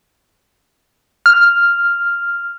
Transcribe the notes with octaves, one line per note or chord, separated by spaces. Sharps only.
F6